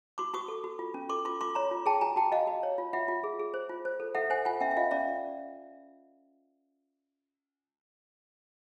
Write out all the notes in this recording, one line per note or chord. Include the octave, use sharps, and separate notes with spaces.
F#4 C6 D6
F#4 C#6 D#6
A4
F#4
F4
C#4
A4 C6 D6
F4 C6 D6
F4 C6 D6
C#5 A#5 C6
F4
G#4 G5 A5
F#4 G#5 A#5
F#4 G5 A5
F#4 D#5 F5
F#4
C#5
F4
F4 E5 F#5
F4
G#4
G#4
C5
F4
C5
A4
A4 E5 F#5
C5 F#5 G#5
F4 F#5 G#5
C#4 E5 F#5
E5
F4 D#5 F5
C#4 D5 E5